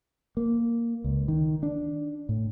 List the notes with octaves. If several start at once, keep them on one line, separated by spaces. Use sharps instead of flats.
A#3
C#2
D#3
D4
A2